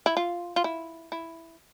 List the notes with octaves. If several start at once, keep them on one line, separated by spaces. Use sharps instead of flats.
E4
F4
F4
E4
E4